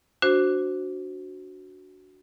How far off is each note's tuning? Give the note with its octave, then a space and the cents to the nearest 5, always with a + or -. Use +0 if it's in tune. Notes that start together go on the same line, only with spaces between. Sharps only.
D4 -10 F#4 +0 C5 +0